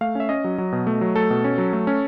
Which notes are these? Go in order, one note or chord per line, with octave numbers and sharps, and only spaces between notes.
A3 F5
C#4 E5
C#4 D#5
F#3
F#3
B2
A3
F#3
A3 A4
B2
C#4
F#3
A3
C#4